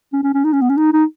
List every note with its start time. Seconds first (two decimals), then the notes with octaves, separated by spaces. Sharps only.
0.13 C#4
0.23 C#4
0.34 C#4
0.44 D#4
0.53 C#4
0.61 B3
0.69 C#4
0.77 D#4
0.93 D#4